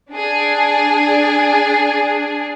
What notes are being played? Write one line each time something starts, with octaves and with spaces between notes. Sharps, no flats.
D4 G#4